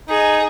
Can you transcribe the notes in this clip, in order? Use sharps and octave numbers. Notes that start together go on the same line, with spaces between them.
D#4 G#4